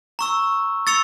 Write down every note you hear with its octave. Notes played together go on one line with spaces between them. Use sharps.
A#5 C#6 E6
C#6 E6 A6 C#7 F7